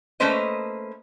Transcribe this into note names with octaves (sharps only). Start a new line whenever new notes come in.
A3 A#3 C#4 B4 C5 D#5